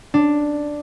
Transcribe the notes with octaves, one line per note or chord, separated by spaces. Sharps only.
D4